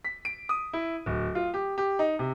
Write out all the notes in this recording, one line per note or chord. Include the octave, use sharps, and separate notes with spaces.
B6
D7
D#6
E4
D1
F4
G4
G4
D#4
C3